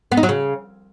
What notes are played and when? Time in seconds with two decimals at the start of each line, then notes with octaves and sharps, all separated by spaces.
0.12 B3
0.17 D#4
0.23 F#3
0.29 C#3